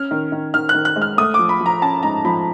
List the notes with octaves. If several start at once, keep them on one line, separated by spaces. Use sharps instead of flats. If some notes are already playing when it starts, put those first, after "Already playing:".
Already playing: C#4 F6
D#3
D#3
D#3 F6
F#6
D#3
F#6
G#3
F6
A3 D#6
F3 D6
B5
F3
A#5
C#4 A5
G#2 A#5
F3 B5